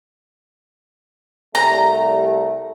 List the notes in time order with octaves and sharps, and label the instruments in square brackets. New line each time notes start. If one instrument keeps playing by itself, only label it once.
[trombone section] C2 G3 A3 [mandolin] A#5